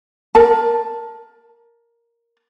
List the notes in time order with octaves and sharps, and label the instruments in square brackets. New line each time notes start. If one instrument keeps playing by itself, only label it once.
[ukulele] A#4 A5